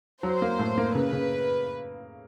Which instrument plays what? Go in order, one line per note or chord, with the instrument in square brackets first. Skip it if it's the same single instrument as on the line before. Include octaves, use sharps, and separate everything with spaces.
[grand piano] F#3 [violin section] C5
[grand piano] A#3
A2
A#3
[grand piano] C#3 [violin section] B4
[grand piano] C#3